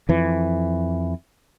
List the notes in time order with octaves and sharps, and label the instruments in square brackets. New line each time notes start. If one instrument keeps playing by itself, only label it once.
[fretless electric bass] F2 E3